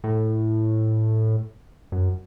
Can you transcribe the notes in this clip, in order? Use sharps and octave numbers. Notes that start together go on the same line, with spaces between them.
A2
F#2